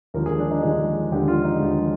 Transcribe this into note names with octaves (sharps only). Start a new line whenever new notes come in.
D#2 D3 F3 G#3 A#4
G#4
D4
D#4
D#2 D3 F3 G#3 G#4
D#2 D3 F3 G#3 G4
F4
D#4
D#2 D3 F3 G#3